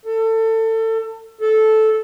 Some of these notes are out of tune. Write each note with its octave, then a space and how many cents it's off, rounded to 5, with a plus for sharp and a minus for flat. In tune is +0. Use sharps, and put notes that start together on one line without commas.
A4 +25
A4 -10